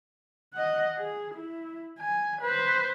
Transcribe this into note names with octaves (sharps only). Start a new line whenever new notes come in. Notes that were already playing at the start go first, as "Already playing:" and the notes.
D#5 F#5
G#4
E4
G#5
B4 C5